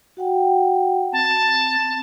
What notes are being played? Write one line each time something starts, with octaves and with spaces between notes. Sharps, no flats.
F#4 F#5 G5
C4 A5
C4